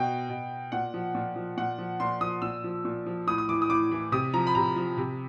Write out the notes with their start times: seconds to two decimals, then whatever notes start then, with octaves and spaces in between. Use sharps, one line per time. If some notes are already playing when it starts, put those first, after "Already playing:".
Already playing: B2 G5
0.30 B2
0.72 A#2 F#5
0.94 F3
1.15 A#2
1.36 F3
1.57 A#2 F#5
1.78 F3
2.00 A#2 C6
2.21 F3 D#6
2.42 A#2 E6
2.64 F3
2.85 A#2
3.06 F3
3.27 A2 D#6
3.38 D#6
3.49 E3 D6
3.62 D#6
3.70 A2 D6
3.92 E3
4.12 C3 D#6
4.34 F3 A#5
4.47 B5
4.55 C3 A#5
4.76 F3
4.97 C3